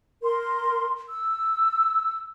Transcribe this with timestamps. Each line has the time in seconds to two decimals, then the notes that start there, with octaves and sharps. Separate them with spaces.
0.22 A#4 C6
1.09 E6